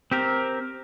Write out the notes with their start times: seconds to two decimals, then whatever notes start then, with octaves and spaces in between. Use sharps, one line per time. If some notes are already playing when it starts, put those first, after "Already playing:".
0.11 C4 G4 A#4